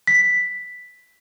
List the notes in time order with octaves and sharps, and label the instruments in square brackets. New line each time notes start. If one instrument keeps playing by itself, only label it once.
[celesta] B6